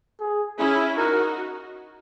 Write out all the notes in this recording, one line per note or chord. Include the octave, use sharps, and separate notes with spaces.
G#4
C#4 E4 G#4
D#4 F#4 A#4